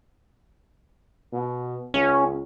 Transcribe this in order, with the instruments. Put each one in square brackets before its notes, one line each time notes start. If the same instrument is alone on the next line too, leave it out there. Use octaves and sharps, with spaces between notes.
[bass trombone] B2
[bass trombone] C#2 [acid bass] C#4